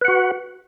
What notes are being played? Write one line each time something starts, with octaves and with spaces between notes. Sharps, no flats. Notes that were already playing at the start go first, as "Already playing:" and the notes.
F#4 B4 F#5